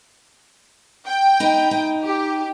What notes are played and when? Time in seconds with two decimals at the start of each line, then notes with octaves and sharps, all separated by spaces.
1.06 G5
1.40 D#4 B4
1.71 D#4
2.03 G4